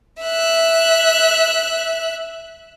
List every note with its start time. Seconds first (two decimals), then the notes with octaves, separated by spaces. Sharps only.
0.21 E5 F#6